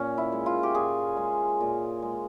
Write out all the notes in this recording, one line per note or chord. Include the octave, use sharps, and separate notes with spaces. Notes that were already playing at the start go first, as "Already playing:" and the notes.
Already playing: A#2 C#4
E4
G#3
F4
G4
A#2 G#4
G#3
A#2
G#3